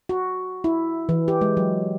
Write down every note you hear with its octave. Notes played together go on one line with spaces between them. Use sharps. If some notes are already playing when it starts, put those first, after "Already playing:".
F#4
E4
E3
G4
G#3
F#3